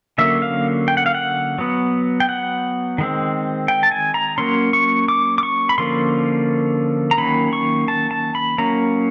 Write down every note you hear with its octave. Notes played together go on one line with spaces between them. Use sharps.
D3 F#3 A#3 C#4 E5
F5
G5
F#5
F5
F#5
F#3 B3
G5
F#5
D#3 G#3 C4
G5
A5
G#5
A#5
F#3 A#3 C#4 C6
C#6
D6
D6
C#6
B5
D3 F3 A#3 C#4 C6
A#5
D#3 F#3 A#3 C#4 B5
C#6
A5
A5
B5
F#3 A#3 C#4 A#5